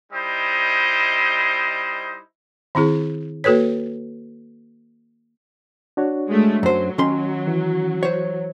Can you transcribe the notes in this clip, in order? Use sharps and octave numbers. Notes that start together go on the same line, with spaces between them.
G3 D#4 E4 C5 D#5
D#3 C4 E4 G#4
A#3 F#4 A4 B4 C#5
D4 F#4 C#5
G#3 A3
F#2 F#3 C5
D#3 C#4 C6
E3
C5 C#5